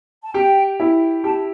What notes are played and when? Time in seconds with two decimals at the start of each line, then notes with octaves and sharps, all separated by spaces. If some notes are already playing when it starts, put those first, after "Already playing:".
0.23 A5
0.34 G4 G5
0.80 E4
1.24 G4 A5